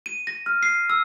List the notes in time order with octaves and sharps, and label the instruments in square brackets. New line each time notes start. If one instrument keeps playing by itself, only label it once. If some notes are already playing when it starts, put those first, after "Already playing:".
[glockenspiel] D#7
A#6
F6
C7
E6